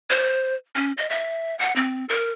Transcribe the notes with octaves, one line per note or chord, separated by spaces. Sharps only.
C5
C#4
D#5
E5
F#5
C4
A#4